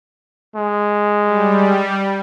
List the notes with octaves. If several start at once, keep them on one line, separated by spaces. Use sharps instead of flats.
G#3
G3